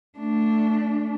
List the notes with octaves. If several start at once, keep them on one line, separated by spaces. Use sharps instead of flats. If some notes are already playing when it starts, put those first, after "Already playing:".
A3 D4